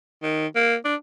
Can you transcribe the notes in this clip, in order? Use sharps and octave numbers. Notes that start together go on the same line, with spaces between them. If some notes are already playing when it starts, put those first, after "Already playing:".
D#3
A#3
D4